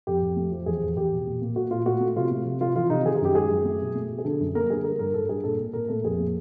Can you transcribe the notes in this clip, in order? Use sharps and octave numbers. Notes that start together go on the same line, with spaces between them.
F2 G4
F2
A3
F3
E2 G#4
E2
E2 G4
B2
A#2
A#3
A#2 F#4
A#2 F4
A3 F#4
A3
C3 F4
A3
C3
C3 F4
E3 F4
C3 D#4
D#3 G#4
G#4
F#2 G4
G#3 G#4
F#2
A3
B2
A3
B2
G#4
D3 A4
F#2
A#3 A#4
D3 G#4
G3 A#4
G2 A#4
G2 A4
G2 G#4
A#2 A4
A#2
A#2 A#4
A3 A4
F2 G#4
A#3